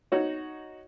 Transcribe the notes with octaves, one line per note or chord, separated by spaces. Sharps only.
D#4 F#4 C#5